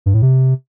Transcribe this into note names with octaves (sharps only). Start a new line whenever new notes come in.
G2
A2
C3